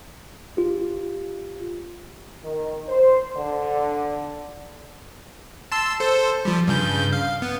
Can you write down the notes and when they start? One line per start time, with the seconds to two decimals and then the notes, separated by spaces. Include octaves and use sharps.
0.57 F4 G4
2.43 D#3
2.87 C5
3.36 D3
5.72 A5 C6 E6
6.00 A4 C5
6.45 F3 G3
6.67 G2 C#3 G6
7.13 F5
7.42 B3